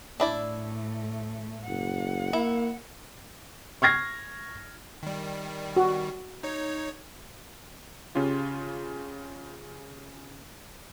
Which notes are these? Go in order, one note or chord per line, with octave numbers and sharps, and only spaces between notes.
A2 A3 D4 E4 D5
F#1 F#5
A#3 E4
C#6 F6 G#6 A#6 C7
D#3 G3
F#4
D#4 C#5
C#3 C#4 F4 G4